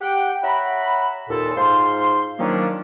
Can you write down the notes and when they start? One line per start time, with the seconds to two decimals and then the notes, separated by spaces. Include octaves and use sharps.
0.01 G4 F#5 G5
0.42 C#5 E5 F#5 A#5 B5
1.29 D#2 A#2 A4
1.55 G#2 F4 C5 C6
2.39 D#3 F3 F#3 A#3 C#4 D4